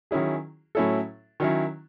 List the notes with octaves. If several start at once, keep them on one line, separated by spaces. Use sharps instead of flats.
D#3 F#3 C#4 E4 G#4
A2 F#3 C#4 E4 A4
D#3 F#3 C#4 E4